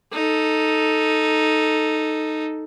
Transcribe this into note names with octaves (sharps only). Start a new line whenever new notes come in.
D#4 A4